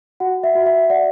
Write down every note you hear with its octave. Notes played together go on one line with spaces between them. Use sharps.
F#4 F#5
E5
F#4
E5
D5 F#5